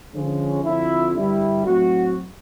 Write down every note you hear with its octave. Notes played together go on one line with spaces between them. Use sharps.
D3 F3 G#3 C#4
F2 D3 F3 E4
G2 D3 G3 E4
A2 F#3 A3 C4 F#4